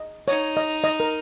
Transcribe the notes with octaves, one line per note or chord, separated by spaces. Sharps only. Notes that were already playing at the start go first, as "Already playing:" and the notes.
Already playing: D#5
D#4 C#5
D#5
D#5
A#4